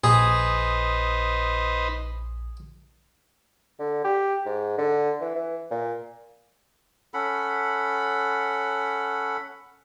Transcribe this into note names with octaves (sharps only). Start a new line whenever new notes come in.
A#1 D#4 G#4 B4 C5
D3
G4
G#2
D3
E3
E3
A#2
C#4 A4 F#5 B5